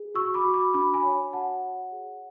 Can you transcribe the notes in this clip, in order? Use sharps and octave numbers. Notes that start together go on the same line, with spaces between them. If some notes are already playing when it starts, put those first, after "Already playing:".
Already playing: G#4
F#4 C#6 E6
B5 D6
F#4
B5 D6
D4 B5 D6
G#5 B5
C#5
F#4 F#5 A5
C#5
G#4